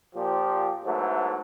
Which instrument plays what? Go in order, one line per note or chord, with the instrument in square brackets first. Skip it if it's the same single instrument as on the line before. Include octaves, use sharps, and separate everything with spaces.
[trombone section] A#2 F3 G4
G#2 F#3 A3 B3 E4 C5